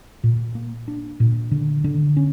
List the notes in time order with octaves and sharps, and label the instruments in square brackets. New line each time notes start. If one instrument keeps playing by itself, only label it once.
[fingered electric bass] A#2
A#3
D4
A#2
D3
D3
C#4